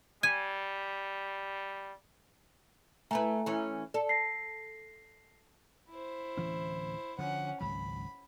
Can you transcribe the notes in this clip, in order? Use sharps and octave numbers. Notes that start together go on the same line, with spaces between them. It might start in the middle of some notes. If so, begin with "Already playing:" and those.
G3 G#5
A3 E4 B4 E5 G#5 A#5
E3 C#4
A4 D5
A#6 C7
E4 C5
D1 E3 C#4
D3 F3 C#4 F#5
G#1 C#2 F#3 B5